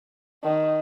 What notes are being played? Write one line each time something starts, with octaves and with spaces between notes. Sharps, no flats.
D#3